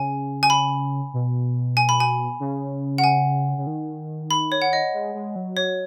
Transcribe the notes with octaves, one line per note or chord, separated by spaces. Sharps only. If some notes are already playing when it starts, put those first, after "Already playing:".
Already playing: C#3 G#5
G#5
B5
B2
G#5
B5
G#5
C#3
F#5
G#5
C#3
D#3
B5
C#5
F#5
D#5
G#3
G#3
F#3
C#5